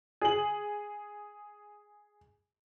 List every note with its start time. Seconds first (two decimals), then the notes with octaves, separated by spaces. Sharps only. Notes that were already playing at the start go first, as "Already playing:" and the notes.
0.21 G#4 F#7